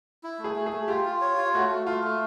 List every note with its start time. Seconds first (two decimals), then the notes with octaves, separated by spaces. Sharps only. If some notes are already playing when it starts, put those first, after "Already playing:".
0.23 E4
0.39 A3
0.44 G#4
0.56 A3
0.66 G#4
0.72 A3
0.88 F4 G4
1.05 F4
1.21 C#5
1.37 F4
1.54 A3 F#4
1.71 A3
1.87 A3 F4
2.03 A3